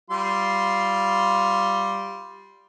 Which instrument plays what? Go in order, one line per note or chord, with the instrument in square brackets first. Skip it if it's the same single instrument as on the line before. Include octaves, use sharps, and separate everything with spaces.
[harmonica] G3 F4 C6